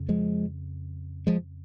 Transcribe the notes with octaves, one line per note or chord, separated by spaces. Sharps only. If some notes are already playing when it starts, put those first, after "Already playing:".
Already playing: F2 C#3
F3 G#3
F3 G#3